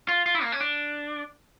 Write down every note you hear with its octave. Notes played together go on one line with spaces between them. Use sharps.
F4
F4
E4
A#3
C#4
D4